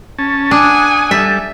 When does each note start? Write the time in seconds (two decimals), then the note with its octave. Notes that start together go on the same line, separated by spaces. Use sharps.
0.19 C#4 A5
0.51 D4 F#5 G#5 D#6
1.11 G3 A4 E5